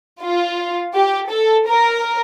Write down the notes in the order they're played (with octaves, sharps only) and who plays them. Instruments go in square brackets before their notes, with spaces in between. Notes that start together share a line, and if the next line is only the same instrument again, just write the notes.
[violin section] F4
G4
A4
A#4